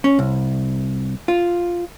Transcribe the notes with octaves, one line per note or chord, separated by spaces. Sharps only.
C#4
C2
F4